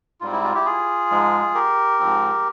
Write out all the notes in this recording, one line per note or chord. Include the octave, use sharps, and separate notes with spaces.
G#2 G3 C4 F4
E4
F4
E4 G4
F4 G#4
G#2 F3 G#3
G4 A#4
G#2 F3 C4